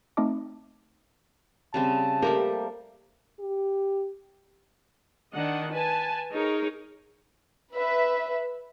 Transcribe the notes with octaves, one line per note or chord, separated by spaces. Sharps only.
A3 C4 D#4 D#5 A5 D6
C#3 G3 C4 A5
G3 A3 A#3 G4 A#4
G4
D#3 D4 D#5 F#5
B4 G#5 A5
D#4 G#4 A#4 C#5
B4 E5